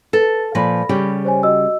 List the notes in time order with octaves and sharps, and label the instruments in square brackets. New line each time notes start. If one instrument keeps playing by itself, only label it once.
[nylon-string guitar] A4 [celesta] B4 A6
[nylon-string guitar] A#2 F3 B4 [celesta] B5 A#6
[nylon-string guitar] C#3 G3 G4
[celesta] C5 C#5 G#5
F#4 D#5 E6